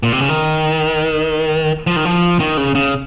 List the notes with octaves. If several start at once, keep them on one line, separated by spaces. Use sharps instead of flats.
A#2
C3
C#3
D#3
F3
D#3
F3
D#3
C#3
C#3